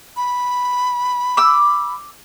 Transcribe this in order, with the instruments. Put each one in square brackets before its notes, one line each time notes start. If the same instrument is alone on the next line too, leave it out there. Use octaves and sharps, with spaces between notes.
[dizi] B5
[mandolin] D6 E6